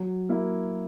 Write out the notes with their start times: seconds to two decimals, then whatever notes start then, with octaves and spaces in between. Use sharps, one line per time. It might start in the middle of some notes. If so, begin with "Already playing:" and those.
Already playing: F#3
0.29 A#3 E4